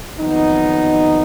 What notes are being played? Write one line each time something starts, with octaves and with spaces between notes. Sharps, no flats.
F2 D#3 F#3 B3 D#4